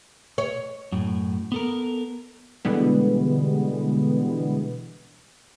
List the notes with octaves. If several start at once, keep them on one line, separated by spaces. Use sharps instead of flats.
C#5
F#2 A2
B3 A4 A#4
B2 D3 E3 G3 G#3 B3